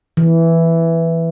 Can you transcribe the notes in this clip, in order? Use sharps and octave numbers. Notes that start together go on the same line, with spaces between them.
E3